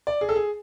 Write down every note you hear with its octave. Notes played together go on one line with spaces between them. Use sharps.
D5
G#4
A4
G#4